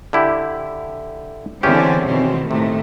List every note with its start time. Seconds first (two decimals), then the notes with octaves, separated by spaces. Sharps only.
0.13 D3 E4 G4
1.63 E2 D3 E3 C4 C#4 G4
2.07 B2 D#3 C4
2.51 A2 C3 D#3 A3